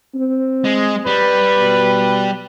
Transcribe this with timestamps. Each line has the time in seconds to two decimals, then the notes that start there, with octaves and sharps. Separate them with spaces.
0.15 C4
0.65 G#3
1.06 G3 B4
1.58 B2